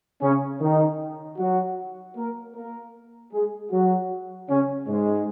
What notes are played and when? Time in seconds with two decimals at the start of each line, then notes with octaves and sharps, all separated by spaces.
0.22 C#3 C#4
0.61 D#3 D#4
1.39 F#3 F#4
2.17 A#3 A#4
2.55 A#3 A#4
3.33 G#3 G#4
3.72 F#3 F#4
4.50 C#3 C#4
4.88 G#2 G#3